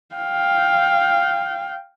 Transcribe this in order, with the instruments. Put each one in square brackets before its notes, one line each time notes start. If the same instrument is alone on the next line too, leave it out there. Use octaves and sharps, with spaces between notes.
[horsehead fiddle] F5 G5